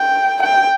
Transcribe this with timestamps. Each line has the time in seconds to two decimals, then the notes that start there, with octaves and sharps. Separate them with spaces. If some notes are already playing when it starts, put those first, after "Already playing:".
Already playing: G5
0.43 G5